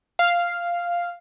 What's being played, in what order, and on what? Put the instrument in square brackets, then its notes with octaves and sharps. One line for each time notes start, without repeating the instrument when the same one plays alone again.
[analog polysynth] F5